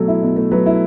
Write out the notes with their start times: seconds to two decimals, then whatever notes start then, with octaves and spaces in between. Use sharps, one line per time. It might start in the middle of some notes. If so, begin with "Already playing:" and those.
Already playing: B2 F#3 A3 A4
0.08 E4
0.23 B2
0.36 A3
0.51 F#3 B4
0.66 E4